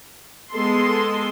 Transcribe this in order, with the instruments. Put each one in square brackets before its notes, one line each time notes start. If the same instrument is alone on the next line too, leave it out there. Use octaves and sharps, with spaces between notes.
[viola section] G#3 B3 A4 C6